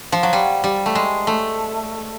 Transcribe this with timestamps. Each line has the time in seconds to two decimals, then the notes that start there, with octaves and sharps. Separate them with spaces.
0.12 F3
0.23 F#3
0.33 G3
0.64 G3
0.86 A3
0.95 G#3
1.27 A3